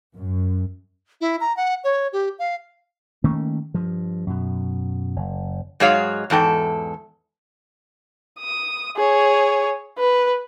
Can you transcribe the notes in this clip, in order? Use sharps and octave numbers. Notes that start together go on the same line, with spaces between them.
F#2
E4
A#5
F#5
C#5
G4
F5
D#3 A3 A#3 C#4
G2 F3
F#2 B2
F#1
G#2 F#3 G#3 G#4 C#5 F5
E2 G#2 A4 G5
D#6
G#4 C#5
B4